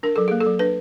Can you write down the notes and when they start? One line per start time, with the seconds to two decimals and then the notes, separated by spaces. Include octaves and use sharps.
0.03 D4 A#4
0.16 F#3 A4
0.28 A#3 G#4
0.41 A4
0.46 F#3
0.59 D4 B4